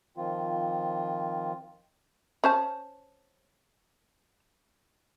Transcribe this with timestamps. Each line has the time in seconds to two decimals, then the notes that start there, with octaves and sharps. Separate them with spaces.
0.17 D#3 F3 C4 F4
2.44 C#4 C5 A5